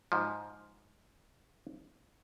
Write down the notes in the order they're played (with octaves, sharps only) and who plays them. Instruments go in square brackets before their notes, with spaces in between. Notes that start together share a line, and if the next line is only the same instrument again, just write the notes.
[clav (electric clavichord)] G#2 F3